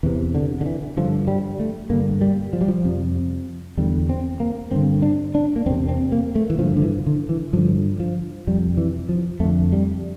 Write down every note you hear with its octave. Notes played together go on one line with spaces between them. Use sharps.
E2 C3 E3
D3
D3
E3
G2 D3 F3
G3
A3
G2 D3 A#3
G3
F3
G3
F3
F2 C3
E2 D3 G3
C4
A#3
G2 D3 C4
D4
D4
A#3
E2 C3 C4
C4
A#3
A3
E3
G2 D3 F3
D3
E3
D3
E3
G2 D3 F3
F3
F2 C3 G3
E3
F3
F2 D3 A3
G3